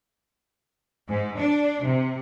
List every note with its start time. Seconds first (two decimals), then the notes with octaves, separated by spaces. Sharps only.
1.08 G#2
1.37 D4
1.83 C3